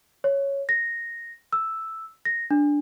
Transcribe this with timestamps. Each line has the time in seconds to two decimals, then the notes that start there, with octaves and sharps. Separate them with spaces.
0.24 C#5
0.69 A#6
1.53 E6
2.25 A#6
2.51 D4